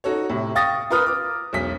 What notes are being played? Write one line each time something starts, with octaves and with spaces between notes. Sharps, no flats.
D#4 F#4 A4 C#5
A2 C3
F5 G5 C#6 D#6 A6 A#6
F4 A#4 B4 D#6 F6
D6
E1 B1 B6